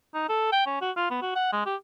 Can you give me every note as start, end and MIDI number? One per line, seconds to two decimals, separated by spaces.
0.14 0.27 63
0.29 0.51 69
0.52 0.63 79
0.66 0.80 61
0.82 0.91 66
0.97 1.07 65
1.10 1.20 59
1.22 1.36 66
1.36 1.49 78
1.53 1.66 56
1.66 1.76 67